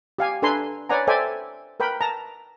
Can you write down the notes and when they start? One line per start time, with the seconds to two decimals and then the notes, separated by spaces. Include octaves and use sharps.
0.19 G4 F5 G#5
0.42 D4 A4 B4 G#5 A#5 C6
0.89 B4 C#5 D5 F#5 G#5 A#5
1.07 A4 C5 D5 E5 G5 G#5
1.80 A#4 B4 G5 B5
2.01 A5 A#5